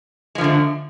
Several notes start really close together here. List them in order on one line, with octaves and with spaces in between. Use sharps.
G#3 F3 D3 A3